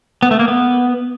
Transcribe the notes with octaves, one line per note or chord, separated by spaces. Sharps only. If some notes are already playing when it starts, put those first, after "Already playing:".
B3
A3
A#3
B3